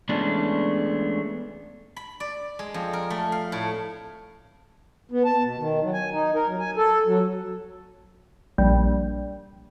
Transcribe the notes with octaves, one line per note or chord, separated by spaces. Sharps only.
E3 G#3 A3 B3 C#4 D4
B5
D5
G#3
F2
A#4
A3
F5
A2
B3
A5
B2
D#3
F#3
G#5
D#4
A#4
F#3
G#5
A4
F#3
A#1 G3